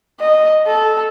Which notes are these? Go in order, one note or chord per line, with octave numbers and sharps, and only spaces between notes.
D#5
A4